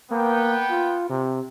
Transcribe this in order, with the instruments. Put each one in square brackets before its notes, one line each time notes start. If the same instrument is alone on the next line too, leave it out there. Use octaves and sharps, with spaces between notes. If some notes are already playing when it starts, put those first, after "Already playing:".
[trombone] A#3 [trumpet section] B3 G5
[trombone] F4
C3